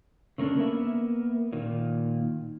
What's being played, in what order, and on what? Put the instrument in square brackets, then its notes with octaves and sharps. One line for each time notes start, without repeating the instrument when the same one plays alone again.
[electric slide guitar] C#3 A3 A#3 C#4 D4
A#3 B3 A#4 E5
A#2 D#3